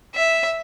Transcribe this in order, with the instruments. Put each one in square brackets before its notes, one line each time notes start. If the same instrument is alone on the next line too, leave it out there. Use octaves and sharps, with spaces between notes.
[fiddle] E5